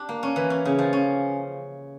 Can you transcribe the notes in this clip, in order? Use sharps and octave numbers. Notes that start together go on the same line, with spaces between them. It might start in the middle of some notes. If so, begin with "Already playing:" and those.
Already playing: D4 G4
A#3
C#4
E3
C#4
C#3
F3
C#4